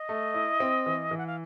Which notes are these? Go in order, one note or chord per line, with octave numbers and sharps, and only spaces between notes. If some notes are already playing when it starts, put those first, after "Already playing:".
Already playing: D#5
A3
E4
C4
E3
E3
F#5
F5